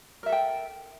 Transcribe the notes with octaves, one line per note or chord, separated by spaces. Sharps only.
A4 A#4 E5 G5